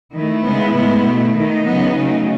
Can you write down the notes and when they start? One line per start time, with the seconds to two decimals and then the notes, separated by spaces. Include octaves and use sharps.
0.14 D#3 A3 E4
0.45 C#3 G#3 B3
0.75 A2 G#3 B3
1.05 B2 A3
1.36 D#3 A3 D#4
1.66 C#3 F#3 B3
1.97 C#3 F#3 A3